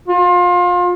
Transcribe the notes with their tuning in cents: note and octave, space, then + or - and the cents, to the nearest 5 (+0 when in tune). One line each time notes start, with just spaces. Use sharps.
F4 +30